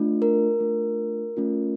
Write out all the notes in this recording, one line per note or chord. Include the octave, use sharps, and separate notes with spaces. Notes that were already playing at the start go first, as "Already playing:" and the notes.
Already playing: A3 D4 F4
A#4
A3 D4 F4
A3 C#4 F4